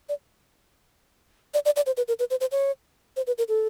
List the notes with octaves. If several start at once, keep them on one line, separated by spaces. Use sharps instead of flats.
D5
D5
D5
D5
C5
B4
A#4
B4
C5
C5
C#5
C5
B4
A#4
A4